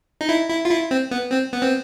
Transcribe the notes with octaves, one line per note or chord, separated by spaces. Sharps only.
D#4
E4
E4
F4
E4
C4
B3
C4
B3
C4